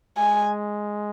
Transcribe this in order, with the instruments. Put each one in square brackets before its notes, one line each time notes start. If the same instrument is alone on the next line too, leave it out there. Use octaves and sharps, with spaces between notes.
[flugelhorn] G#3 [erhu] G#5